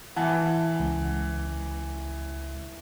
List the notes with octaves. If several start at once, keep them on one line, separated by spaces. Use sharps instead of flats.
E3 F#5 A5
C#2